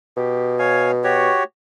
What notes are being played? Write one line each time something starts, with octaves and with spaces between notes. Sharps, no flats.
B2 G4
C#5 F5 G#5
F#4 G4 C#5